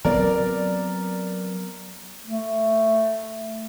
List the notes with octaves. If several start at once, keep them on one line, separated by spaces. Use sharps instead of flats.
F#3 B3 C4 A#4 D5
A3